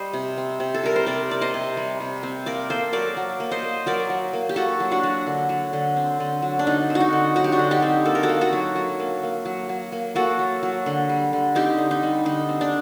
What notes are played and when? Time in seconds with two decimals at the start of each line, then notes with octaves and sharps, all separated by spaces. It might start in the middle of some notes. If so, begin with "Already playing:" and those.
Already playing: G3 C5 D#5
0.13 C3
0.37 C4
0.60 C3
0.74 A4
0.83 G3 A#4
0.96 C5
1.06 C3 A#4 D5
1.30 C4 D5
1.41 C5 D#5
1.54 C3
1.77 G3
2.00 C3
2.23 C4
2.46 A#3 A#4 D5
2.70 A#3 A4 C5
2.93 F#3 A#4 D5
3.17 F#3
3.40 A#3
3.51 C5 D#5
3.63 A#3
3.86 F#3 A#4 D5
4.10 F#3
4.33 A#3
4.49 G4
4.56 A#3 F#4 A4
4.80 F#3
4.91 D4 F#4
5.03 F#3
5.27 D3
5.49 F#3
5.73 D3
5.96 C4
6.20 D3
6.42 F#3
6.59 D4
6.67 D3 D#4
6.90 C4
6.95 F#4
7.01 D#4
7.13 D3
7.36 F#3 F#4
7.44 G4
7.52 D4 F#4
7.59 D3
7.71 D#4 G4
7.82 C4
8.05 A#3 A4
8.15 A#4
8.23 F#4 A4
8.29 A#3
8.41 F#4 A4
8.53 F#3
8.75 F#3
9.00 A#3
9.23 A#3
9.45 F#3
9.69 F#3
9.92 A#3
10.15 A#3 F#4 A4
10.39 F#3
10.63 F#3
10.86 D3
11.09 G3
11.33 D3
11.55 C4 D#4 G4
11.78 D3
11.91 D#4
12.03 G3
12.26 D3 D#4
12.49 C4
12.61 D4